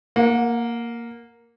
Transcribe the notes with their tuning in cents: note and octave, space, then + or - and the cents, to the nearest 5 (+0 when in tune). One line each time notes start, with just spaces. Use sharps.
A#3 +0 F#5 -35